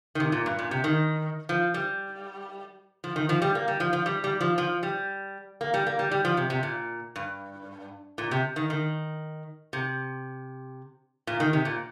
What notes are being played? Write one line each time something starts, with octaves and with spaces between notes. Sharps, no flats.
D#3
C3
A#2
G2
A#2
C3
D#3
F3
G3
F3
D#3
F3
G3
A#3
G3
F3
F3
G3
G3
F3
F3
G3
A#3
G3
A#3
G3
G3
F3
C3
C3
A#2
G2
A#2
C3
D#3
D#3
C3
A#2
D#3
C3
A#2